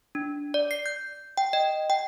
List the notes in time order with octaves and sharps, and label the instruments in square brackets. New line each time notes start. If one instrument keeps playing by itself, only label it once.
[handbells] D4
D5
C7
G6
G5
D#5
G5